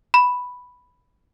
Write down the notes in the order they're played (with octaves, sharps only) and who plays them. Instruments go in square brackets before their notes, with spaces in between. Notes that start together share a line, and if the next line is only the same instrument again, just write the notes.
[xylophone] B5